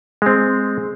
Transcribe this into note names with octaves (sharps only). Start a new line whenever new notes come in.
G#3 C4